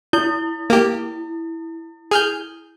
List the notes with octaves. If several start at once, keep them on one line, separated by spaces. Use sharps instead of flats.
E4 G6
A#3 G4
G#4 F6 G6